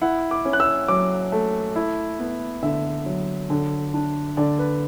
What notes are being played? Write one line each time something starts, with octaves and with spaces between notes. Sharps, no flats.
E4 F#5
D6
C#4
F#6
E6
F#3 D6
A3
E4
B3
D3 E5
F#3
D3
D4
D3 D5
B4